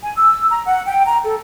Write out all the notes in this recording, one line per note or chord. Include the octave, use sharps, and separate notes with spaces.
G#5
E6
A#5
F#5
G5
A#5
A4